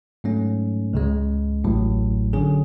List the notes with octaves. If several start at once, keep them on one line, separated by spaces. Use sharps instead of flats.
G#2 F#3 A3 C#4
C#2 C#3 G#3
A1 A2 F#3
D3 F#3 C#4 G#4